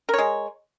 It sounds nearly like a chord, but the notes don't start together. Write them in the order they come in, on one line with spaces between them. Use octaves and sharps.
A#4 C#5 G#3